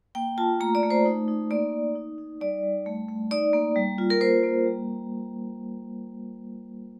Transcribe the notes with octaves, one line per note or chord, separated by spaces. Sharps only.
A#3 G5
F4 A5
A3 A#5
D5
A3
C5
D#4
D#4
A#3 D5
D#4
D#4
D#4
G3 D5
G3
A3
A3
D#4 D5
A#3
G3
F4
A#4
A#3 C5
A#3
G3